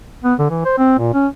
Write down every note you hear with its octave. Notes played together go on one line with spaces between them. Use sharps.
B3
D3
E3
C5
C4
A#2
C#4